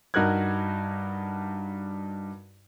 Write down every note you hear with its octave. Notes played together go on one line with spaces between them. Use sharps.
G2 D#4 F#4 A#4 F#6 G#6